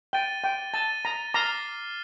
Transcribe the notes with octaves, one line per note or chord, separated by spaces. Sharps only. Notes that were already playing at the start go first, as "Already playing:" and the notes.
G5 A6 D#7 G7
G5
A5 A6 D#7 G7
A#5
A#5 D6 F6 C7 G7